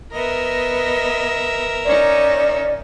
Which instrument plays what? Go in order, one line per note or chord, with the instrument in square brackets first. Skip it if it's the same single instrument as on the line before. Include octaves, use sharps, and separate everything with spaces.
[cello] B3 D#5 [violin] A#4 E5
[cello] C#4 D#4 [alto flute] D5